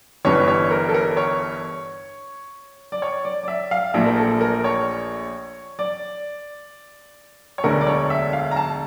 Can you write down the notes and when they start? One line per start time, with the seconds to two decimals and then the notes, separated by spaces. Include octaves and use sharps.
0.25 G1 G2 E3 C#5
0.48 C#5
0.71 A#4
0.89 A4
0.94 A#4
1.17 C#5
2.92 D5
3.02 C#5
3.25 D5
3.43 D5
3.48 E5
3.71 F5
3.94 A#1 A#2 F3 A3 E5
4.06 A#4
4.18 A4
4.41 A#4
4.64 C#5
5.79 D5
7.58 C#5
7.64 E1 D2 D3 A3 A#4
7.81 D5
7.87 C#5
8.10 E5
8.33 F5
8.51 A#5
8.56 A5